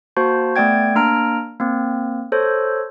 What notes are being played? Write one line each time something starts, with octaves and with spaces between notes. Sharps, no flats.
A#3 F#4 C5 A5
A3 B3 D5 G5 G#6
A#3 D4 A#5 F6 D7
A#3 C4
A4 C5 C#5